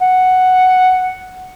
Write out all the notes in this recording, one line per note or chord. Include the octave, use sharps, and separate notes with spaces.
F#5